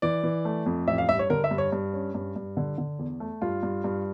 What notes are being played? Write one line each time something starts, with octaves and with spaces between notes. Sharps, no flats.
E3 D5
E3
A3
F2
A1 E5
F5
G2 E5
C#5
D3 A#4
E5
G2
C#5
G2
C#4
G2
G2
D3
D3
E2
A3
G2 F4
G2
G2